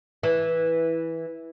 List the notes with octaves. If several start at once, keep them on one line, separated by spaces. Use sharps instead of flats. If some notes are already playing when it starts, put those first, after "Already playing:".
E3